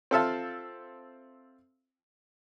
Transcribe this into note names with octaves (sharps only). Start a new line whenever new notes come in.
C4 F4 A4 E5 F5 A5